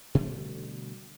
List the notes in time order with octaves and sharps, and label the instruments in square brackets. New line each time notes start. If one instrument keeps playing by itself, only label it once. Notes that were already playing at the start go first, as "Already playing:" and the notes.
[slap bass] B2 D3 G3 A3